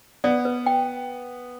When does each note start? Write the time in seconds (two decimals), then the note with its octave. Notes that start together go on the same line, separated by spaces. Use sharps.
0.24 B3 D5
0.45 B4
0.66 G5